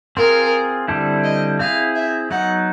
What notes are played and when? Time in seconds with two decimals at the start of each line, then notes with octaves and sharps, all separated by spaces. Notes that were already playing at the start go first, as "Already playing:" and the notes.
0.17 C4 F4 G#4 A#4
0.88 D3 G3 C4 E4 A4
1.24 D#5
1.59 C4 E4 G#4 F5
1.96 E5
2.30 F#3 B3 D#4 F#5